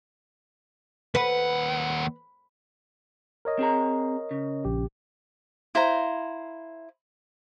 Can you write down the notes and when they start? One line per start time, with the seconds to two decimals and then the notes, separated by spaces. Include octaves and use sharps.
1.15 D#2 B4 F#5
3.45 A#4 C#5 D#5
3.59 C4 G#4 A#5
4.31 C#3
4.65 A#1 G4
5.75 E4 C5 F5 A#5